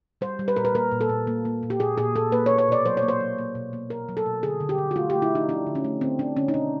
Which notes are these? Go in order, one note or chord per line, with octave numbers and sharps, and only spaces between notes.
G3 C5
G3
B4
A#2 A#4
B4
A#3 A#4
A#2
A4
A#2
A#3
A#3
A#2
G4
A#2 G#4
A#2 G#4
A#2 A4
A#3 B4
C#5
A#3
C#5
B2 D5
F#3 C5
C#5
A#3
C5
F#3
A#3
B2
A#3
B2 A#4
F#3
A4
B2
D3 G#4
D3
G4
D3
F#4
A3 F4
A3 G4
E4
F3 D#4
F3 D4
D3
C#4
A3
D3 C4
D3 D4
D3 C#4
D#4
B2 D4